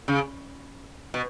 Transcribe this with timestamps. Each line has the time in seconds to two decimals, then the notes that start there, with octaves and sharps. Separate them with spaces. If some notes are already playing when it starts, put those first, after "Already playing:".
0.08 C#3
1.14 B2